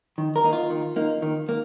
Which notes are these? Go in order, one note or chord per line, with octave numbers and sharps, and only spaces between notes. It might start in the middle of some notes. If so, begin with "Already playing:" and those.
D#3
A#4
A#3 D#4
F4
D#3
A#3 D#4
D#3
A#3